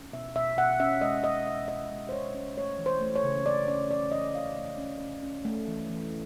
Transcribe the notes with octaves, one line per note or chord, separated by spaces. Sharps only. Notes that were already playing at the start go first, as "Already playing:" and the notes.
Already playing: C#4
B2 E5
B2 E5
B2 F#5
C#4 E5
G#3 D#5
C#4 D#5
C#4 E5
B2 D#5
G#3
C5
G#3 C#5
C#4
A3 C#5
E3
C5
A3
C#5
C#3
C#4 D5
C#4 D5
C#3 D5
E3 D#5
C#4 F5
A3
C#4
C#4
C#4
A3
E3
E3